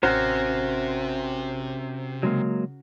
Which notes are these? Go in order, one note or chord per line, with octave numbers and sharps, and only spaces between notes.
A1 C3 C#4 F#4 A#4 C5
C#3 F#3 G#3 A#3